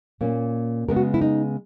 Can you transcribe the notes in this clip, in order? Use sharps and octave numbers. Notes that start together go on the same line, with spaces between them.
A#2 A#3 C#4
C#3 G#3 B3 A#4
F#4
E4
D#4